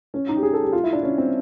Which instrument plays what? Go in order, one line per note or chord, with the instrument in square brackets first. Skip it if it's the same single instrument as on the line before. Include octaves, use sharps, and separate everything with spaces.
[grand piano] C#4
D#4
G4
G#4
A4
G4
F4
E4
D4
C#4
C4